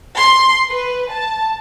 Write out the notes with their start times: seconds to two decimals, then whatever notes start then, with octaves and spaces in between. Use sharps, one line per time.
0.16 C6
0.70 B4
1.10 A5